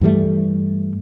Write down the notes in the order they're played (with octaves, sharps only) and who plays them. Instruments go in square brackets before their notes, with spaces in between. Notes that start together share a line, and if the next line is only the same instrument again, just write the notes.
[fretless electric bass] G2 E3 G3 A3